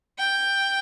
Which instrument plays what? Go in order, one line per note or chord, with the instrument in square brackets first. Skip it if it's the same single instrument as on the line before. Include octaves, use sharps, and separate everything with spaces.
[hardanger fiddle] G5